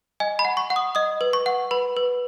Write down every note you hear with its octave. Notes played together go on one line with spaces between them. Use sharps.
D#5 G#5
B5
F#5
C#6
F#5
D#6
D#5 D#6
B4
C#6
F#5
B4 B5
B4